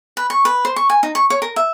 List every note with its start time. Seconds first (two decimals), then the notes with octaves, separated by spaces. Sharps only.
0.17 B4
0.30 C#6
0.45 B4
0.65 C5
0.76 C#6
0.90 G#5
1.03 D#4
1.15 C#6
1.30 C#5
1.42 A#4
1.56 E5